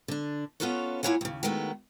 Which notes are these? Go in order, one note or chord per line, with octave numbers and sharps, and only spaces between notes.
D3 D4
B3 C#4 F4 A4 B4 C#5
A#3 E4 F4 C#5 F#5 G#5
D#2 C#3
D#3 F#3 G#3 A3 B3